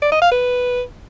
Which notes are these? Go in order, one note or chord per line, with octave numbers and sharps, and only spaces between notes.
D5
D#5
F5
B4